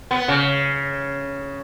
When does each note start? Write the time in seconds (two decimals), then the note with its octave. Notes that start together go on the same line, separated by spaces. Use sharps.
0.11 B3
0.28 C#3